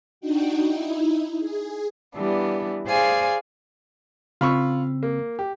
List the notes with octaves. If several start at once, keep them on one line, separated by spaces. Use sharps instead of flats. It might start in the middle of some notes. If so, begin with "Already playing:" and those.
D4 D#4 F#4 G5
D#4 E4
G#4
E3 G3 B3 D4
G#4 C5 D5 F5 G#5
C#3 C4 F4 B5 C#6 E6
A#3
G4